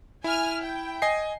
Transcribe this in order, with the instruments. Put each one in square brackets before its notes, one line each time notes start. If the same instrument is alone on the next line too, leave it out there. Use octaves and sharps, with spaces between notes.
[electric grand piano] E4 [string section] G#5 F6
[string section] G5
[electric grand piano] D#5 G#5 C7